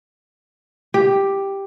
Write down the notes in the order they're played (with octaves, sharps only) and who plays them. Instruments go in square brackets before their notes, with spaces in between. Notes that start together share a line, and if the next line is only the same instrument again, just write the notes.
[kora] G4